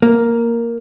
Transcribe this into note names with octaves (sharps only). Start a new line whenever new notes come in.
A#3